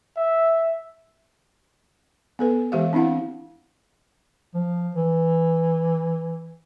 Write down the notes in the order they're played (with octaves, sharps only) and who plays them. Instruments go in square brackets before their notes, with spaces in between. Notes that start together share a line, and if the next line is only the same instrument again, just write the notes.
[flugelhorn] E5
[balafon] B3 A4 B4
E3 G#3 G4 E5 F5
C4 D4 E4 F5 F#5
[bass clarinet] F3
E3